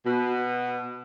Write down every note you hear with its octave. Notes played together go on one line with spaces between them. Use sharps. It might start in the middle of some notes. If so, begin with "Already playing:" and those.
B2